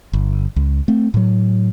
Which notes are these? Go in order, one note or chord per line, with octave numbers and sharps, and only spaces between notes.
G1
C#2
A3 C4
A2 F#3